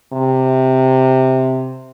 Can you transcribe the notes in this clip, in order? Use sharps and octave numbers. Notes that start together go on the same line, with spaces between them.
C3